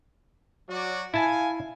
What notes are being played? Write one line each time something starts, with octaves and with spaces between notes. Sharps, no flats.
F#3 F#4 D5
E4 F5 G#5 A5